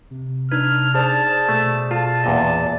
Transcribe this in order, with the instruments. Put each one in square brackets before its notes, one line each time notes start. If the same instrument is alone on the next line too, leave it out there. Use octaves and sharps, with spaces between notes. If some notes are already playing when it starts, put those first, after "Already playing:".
[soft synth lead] C3
[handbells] D4 D#4 G#6 [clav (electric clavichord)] B4 [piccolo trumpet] F6
[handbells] G#4 C5 D5 [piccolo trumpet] A5
[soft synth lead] B2 [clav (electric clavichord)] A3
[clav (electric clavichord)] F4 [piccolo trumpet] A5
[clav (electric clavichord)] E2 A#2 D#5